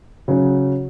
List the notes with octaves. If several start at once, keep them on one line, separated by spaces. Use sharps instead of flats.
C#3 F#3 C#4 F#4